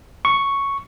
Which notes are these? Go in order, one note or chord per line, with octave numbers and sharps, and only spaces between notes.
C#6